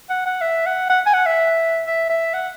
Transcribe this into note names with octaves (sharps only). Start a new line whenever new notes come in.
F#5
F#5
E5
F#5
F#5
G#5
F#5
E5
E5
E5
F#5